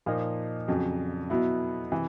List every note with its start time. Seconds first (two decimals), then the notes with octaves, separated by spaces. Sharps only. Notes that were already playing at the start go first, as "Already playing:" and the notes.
0.06 A#2 F3 A#3 D#4
0.68 F2 C#3 F#3
1.30 B2 F#3 B3 E4
1.92 C3 E3